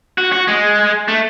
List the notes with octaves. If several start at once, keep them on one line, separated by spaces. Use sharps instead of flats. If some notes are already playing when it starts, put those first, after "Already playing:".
F#4
F#4
G#3
A3